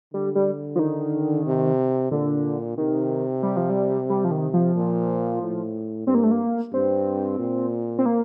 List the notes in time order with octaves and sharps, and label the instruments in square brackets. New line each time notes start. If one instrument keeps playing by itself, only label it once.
[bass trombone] D3 [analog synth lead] G3
[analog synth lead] G3
F3
D#3
[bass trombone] C3
[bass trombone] A#2 [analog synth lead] D3
[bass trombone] C3 [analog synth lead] D#3
[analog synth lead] G3
F3
G3
G3
F3
D#3
F3
[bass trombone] A#2
A2
[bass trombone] G2 [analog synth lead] C4
[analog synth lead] A#3
A3
A#3
[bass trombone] G2 [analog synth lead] C4
[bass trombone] A#2
[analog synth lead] C4
A#3